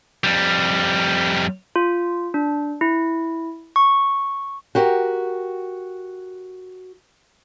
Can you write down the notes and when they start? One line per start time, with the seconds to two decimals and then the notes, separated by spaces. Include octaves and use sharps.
0.24 F2 G3
1.76 F4
2.34 D4
2.81 E4
3.76 C#6
4.75 F#4 G4 A#4